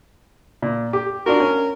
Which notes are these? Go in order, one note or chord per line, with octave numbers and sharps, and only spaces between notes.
A#2
G4
D4 F4 F#4 A#4
C#4